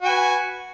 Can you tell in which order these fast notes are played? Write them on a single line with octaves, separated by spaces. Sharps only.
F#4 G#5 B4